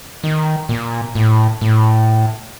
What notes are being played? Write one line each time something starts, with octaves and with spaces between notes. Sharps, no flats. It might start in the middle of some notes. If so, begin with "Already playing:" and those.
D#3
A#2
A2
A2